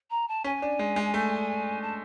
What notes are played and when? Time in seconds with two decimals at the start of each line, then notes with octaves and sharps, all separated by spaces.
0.11 A#5
0.28 A5
0.44 C#4 G#5
0.62 D4
0.79 G#3
0.96 G#3
1.14 A3
1.82 A5